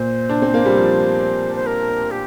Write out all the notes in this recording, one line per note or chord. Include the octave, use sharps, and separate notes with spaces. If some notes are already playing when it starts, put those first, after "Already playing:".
Already playing: A#2 C5
D4
C4
A#3
G3
F3
C5
A#4
G4